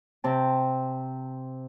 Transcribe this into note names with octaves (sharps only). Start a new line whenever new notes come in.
C3 C4 A5